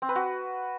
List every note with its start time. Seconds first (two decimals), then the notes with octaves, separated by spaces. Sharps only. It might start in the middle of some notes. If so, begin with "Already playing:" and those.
0.02 C4
0.09 B4
0.15 F#4